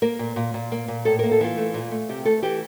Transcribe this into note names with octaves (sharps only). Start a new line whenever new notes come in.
A#3 A#4
A#2
A#2
A#2
A#3
A#2
A2 A4
A#3 A#4
A4
E3 F4
A3
A#2
A3
C3 G4
A3 A4
E3 G4